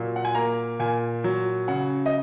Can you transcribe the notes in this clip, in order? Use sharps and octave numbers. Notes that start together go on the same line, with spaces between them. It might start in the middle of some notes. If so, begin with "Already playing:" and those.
Already playing: A#2 F#3
F#5
G#5
A#3 A#5
A#2 G#5
F#3
C#3 F#5
D#5